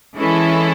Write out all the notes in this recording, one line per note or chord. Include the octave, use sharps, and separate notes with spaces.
E3 G#3 C#4 E4 A4